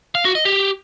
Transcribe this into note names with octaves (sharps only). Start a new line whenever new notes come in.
F5
F#4
D#5
G4